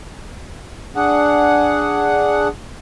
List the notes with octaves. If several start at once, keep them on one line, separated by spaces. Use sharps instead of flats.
D4 G#4 F#5